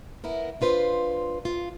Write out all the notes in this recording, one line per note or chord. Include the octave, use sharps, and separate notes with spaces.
B3 E4 A#4
D4 F4 B4 C5
F4